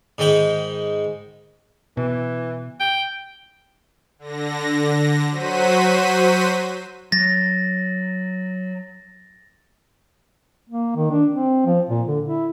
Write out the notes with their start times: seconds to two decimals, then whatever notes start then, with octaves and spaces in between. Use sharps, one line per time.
0.18 G#2 D#3 G#3 G5 B5
1.97 B2 E3
2.80 G5
4.19 D3 A#6
5.31 F#3 F#4 C5 B6 D#7
7.12 F#3 A6 A#6
10.69 A#3
10.96 D#3
11.11 D4
11.30 C4
11.66 F3
11.89 A#2
12.08 D3
12.26 E4